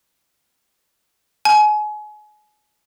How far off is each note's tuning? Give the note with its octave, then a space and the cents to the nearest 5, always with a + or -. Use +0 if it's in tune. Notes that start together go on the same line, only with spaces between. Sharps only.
G#5 +30